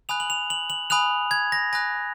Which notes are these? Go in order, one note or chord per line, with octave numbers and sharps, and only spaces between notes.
G#5 B5 D#6 F#6 F7
F#7
F7
F#7
F#7
G#5 B5 D#6 F#6 F7
G#6
A#6
G#5 B5 D#6 F#6 A#6